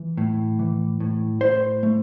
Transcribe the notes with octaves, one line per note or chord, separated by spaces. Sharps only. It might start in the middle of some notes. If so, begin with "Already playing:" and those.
Already playing: E3
A2
E3
A2
A2 C5
A3